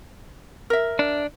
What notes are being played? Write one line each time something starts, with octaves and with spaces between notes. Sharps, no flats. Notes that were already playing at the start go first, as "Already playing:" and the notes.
A#4 E5
D4